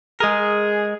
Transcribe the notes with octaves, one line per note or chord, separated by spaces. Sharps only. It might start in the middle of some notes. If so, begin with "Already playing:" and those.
G#3 G#4 A#4